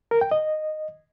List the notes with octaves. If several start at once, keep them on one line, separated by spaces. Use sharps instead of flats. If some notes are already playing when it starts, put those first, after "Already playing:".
A#4
G5
D#5